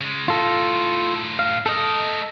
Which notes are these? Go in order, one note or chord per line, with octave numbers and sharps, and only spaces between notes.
C#3 G#3
A2 D#4 F4 A4
F5
A3 A4 A#4 D#5